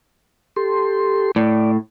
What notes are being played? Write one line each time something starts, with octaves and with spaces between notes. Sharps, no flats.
G4 A4 C6
A2 D5